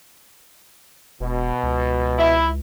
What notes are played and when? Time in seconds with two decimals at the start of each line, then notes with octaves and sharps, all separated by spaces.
1.20 E1 B2
1.63 C#2
2.18 E4